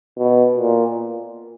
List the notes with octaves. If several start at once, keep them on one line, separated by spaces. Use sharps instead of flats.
B2
A#2